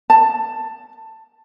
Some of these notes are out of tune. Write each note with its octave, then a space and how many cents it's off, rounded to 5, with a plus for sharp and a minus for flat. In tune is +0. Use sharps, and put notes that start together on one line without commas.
A5 +10